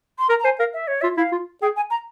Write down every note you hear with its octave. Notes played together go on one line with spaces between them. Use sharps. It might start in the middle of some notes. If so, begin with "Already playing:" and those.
C6
A#4 A#5
A#5
C5 G#5
A#4 F5
E5
C#5
F4 E5
E4 F5
F4
G#4 G5
G#5
A#5